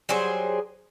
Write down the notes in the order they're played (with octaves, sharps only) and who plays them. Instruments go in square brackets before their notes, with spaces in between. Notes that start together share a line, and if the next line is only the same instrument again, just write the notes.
[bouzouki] F#3 G3 G#4 C5